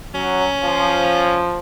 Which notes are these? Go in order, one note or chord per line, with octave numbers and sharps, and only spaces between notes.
F#3 C#4
F3